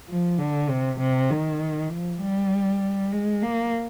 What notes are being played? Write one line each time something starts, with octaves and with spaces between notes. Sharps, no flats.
F3
D3
C3
C3
D#3
F3
G3
G#3
A#3